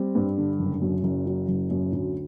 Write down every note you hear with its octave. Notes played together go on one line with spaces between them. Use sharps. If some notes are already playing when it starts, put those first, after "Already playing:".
Already playing: G3 C4
G2
D3
F#1
F#2
F#1
F#3
F#1
F#2
D2